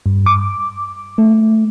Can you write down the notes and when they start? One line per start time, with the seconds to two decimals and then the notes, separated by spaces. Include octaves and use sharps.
0.06 G2
0.26 D6
1.18 A3